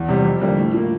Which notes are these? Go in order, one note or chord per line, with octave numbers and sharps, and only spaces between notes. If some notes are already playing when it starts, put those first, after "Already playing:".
Already playing: E2
C3 G3
F2
D3 G3 A#3
A2
F3 A#3